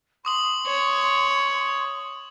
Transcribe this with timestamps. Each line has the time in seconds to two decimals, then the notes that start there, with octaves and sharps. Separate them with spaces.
0.25 C6 C#6 D#6 F#7
0.67 C#5